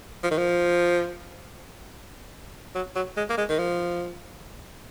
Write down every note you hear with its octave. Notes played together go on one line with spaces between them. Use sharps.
F3
D#3
F3
F#3
F#3
G#3
A#3
G#3
D#3
F3